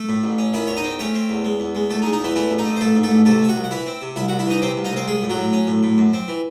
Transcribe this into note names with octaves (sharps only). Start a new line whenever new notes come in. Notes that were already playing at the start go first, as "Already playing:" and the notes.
Already playing: A3 A4
A2
A1
C#4
D#3 E4 E5
E2 C#5
D#4 D#5
C4
A3 C#4 C#5
C4
E2
G#3
E2
G#3
E2 A3 A4
D#4
G#3
D#4
E2 E3 E4
E3 A3 E4
A1
D#4
A3
C5
A1 A3 A4
G#2
A3 A4
A1
C3 A3 A4
C3 E5
F#4 F#5
C2
F#5
E3 E4 E5
C4
C3
C2 E4 E5
C2 F#4 F#5
E4 E5
E3 D#4 D#5
C3 C4 C5
C2
D#4 D#5
C2 C4 C5
G#3 G#4
A2
F#3 F#4
A2
C#4
A2
A2
F#2
C4
E3